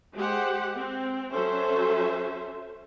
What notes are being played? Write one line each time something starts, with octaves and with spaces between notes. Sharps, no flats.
G#3 G4 C5 F#5
C4
F#3 C#4 A4 C5 E5